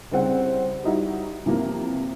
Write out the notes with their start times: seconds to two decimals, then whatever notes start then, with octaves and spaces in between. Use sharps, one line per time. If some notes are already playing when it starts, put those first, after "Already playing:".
0.11 C2 C#3 C4 F#5
0.84 G3 D#4 E4 F#4
1.46 C3 E3 F3 A#3